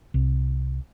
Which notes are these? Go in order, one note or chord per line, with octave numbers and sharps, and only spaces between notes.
C2